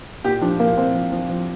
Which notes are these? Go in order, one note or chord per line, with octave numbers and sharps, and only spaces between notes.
A#2 G4
F3 D4
A#2 A#3
A#2 C4
F3
F3
F3